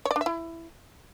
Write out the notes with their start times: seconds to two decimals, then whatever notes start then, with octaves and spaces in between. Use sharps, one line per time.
0.05 C#5
0.11 D5
0.16 D4
0.21 E5
0.26 E4